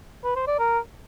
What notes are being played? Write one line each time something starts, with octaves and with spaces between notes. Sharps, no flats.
B4
C5
D5
A#4